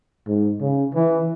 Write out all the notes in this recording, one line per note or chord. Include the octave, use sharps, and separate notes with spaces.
G#2
C#3
E3